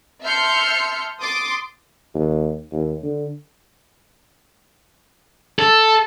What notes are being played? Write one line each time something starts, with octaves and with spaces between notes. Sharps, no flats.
E5 A5 C6 F6 G6 C#7
C6 D6 D#6 A6
D#2
D#2
D3
A4